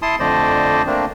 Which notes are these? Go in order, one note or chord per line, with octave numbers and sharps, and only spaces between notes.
E4 A5 C6 D#6
F2 D3 A3 C5 D5 D#5
A3 A#3 C4 D4